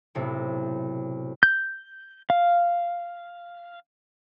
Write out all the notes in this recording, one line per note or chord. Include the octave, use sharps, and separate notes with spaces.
B1 A2 C3
G6
F5